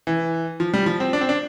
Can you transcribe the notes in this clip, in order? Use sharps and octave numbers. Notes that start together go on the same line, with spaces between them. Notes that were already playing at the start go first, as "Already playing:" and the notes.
E3
F3
G3
F3
C4
D4
C4
D4